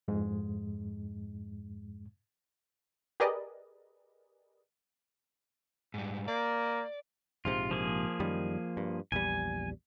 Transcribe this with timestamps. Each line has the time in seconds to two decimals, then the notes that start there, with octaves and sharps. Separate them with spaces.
0.08 F2 G#2 G#3
3.20 G4 G#4 A#4 B4 D5 D#5
5.94 G#2 G3
6.28 A#3 D5
7.45 A#1 G#2 C3 F4
7.71 F3 A#3 G#4
8.20 F#2 D#3 G3
8.77 G2
9.12 A#1 E2 G3 G#5